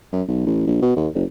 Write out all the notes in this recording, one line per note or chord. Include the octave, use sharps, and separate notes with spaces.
F#2
B1
A1
A#1
B2
D#2
F#1